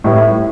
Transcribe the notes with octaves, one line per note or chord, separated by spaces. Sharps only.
A2 G3 B3 E4